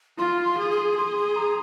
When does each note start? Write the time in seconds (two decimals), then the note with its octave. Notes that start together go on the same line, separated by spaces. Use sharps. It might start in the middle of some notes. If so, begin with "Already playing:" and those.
0.18 F4 C6
0.45 C6
0.59 G#4
0.71 C6
0.97 G#4 C6
1.17 C6
1.36 A#5